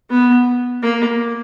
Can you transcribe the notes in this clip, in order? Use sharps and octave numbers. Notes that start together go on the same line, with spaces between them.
B3
A#3